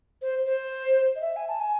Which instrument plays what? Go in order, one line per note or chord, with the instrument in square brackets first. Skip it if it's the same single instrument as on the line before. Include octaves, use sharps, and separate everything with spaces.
[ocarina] C5
C5
D#5
E5
G#5
A5
G#5